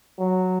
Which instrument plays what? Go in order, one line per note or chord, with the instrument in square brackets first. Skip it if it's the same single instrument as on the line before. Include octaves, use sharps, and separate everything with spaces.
[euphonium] F#3